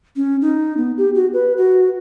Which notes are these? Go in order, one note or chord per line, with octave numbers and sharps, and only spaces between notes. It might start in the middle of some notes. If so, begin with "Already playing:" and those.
C#4
D#4
B3
G4
F#4
B4
F#4